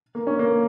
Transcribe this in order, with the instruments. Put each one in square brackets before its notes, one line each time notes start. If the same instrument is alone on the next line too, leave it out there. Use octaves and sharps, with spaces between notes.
[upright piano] A#3
C#4
A#3